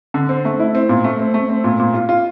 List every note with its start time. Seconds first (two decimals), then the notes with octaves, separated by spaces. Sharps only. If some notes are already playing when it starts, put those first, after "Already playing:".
0.14 D3
0.29 C4
0.45 A3
0.59 E4
0.75 C4
0.89 A#2
1.04 A3
1.19 C4
1.34 A3
1.49 C4
1.64 A#2
1.80 A#2
1.94 F4
2.09 F4